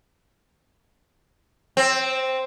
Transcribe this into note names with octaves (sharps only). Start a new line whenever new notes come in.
C4